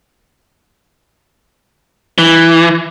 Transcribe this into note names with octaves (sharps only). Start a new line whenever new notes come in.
E3